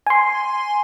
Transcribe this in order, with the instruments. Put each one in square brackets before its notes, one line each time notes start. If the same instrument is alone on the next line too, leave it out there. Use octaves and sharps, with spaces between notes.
[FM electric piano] G#5 C6